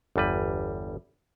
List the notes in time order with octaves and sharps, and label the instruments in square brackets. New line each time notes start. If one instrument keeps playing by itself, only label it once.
[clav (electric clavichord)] G1 E2 G3 B4